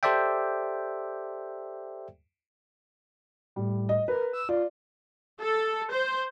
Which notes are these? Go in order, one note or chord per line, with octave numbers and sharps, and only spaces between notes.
G4 A4 C5 D5 E5 G5
A2 G3
D#5
A#4 B4
E6
F4 D5
A4
C5